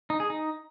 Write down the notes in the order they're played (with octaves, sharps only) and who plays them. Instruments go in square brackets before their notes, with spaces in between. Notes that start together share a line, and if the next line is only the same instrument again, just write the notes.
[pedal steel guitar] D#4
G#4
D#4